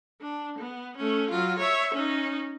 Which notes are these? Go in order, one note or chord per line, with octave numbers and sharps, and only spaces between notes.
D4
B3
A3 C#4
F#3 F4
C#5 E5
C#4 D#4